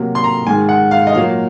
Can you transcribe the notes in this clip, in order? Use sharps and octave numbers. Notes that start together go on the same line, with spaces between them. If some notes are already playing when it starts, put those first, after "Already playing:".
Already playing: C3 F#3 A#3
C6
A#5
G#2 D#3 G#3 G#5
F#5
F5
D#5
A#2 F#3 A#3 F5